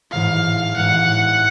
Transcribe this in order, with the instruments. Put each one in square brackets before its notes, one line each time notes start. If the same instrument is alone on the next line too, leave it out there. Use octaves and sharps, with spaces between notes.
[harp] A1 G#2 E3 [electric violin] F5
[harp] A1 G#2 E3 [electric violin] F#5